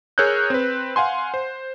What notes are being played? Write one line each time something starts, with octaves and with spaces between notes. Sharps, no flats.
G#4 A#4 C#5 E6 F#6 G6
C4 B4
F5 F#5 G#5 C6
C5